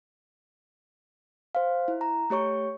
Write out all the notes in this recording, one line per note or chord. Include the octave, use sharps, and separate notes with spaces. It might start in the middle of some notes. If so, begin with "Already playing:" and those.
C5 F5
E4
A#5
A3 G4 C#5 C#6